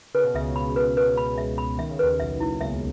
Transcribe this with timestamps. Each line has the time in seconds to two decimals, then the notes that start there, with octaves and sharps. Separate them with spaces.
0.14 C#3 B4
0.24 B2
0.34 C#2 C#3 E5
0.56 B5
0.76 B4
0.97 B4
1.17 B5
1.38 E5
1.58 B5
1.79 D#3 E5
1.90 C#3
1.99 D#2 D#3 B4
2.20 B1 B2 E5
2.40 E4
2.61 C#2 C#3 E5